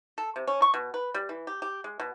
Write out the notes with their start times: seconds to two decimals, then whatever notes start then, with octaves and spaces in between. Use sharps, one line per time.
0.18 A4
0.36 C3
0.47 C#4
0.62 C#6
0.74 B2
0.94 B4
1.14 G3
1.29 E3
1.47 G4
1.62 G4
1.84 G#3
2.00 B2